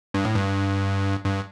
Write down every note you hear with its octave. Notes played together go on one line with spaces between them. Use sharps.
G2
A2
G2
G2